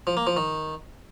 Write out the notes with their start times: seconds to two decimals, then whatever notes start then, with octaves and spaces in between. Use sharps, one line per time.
0.07 F3
0.17 A#3
0.27 F3
0.37 D#3